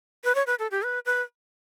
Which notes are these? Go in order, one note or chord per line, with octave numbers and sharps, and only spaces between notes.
B4
C#5
B4
A4
G4
B4
B4